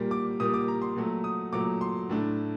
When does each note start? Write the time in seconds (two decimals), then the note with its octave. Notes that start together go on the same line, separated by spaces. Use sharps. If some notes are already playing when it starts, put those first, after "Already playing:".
Already playing: A#2 G3 A#3
0.11 D6
0.40 A#2 G3 A#3 D#6
0.54 D6
0.68 A#5
0.82 C6
0.96 A#2 F#3 A3
1.24 D#6
1.53 A#2 F#3 A3 D6
1.81 C6
2.10 A2 A3 D4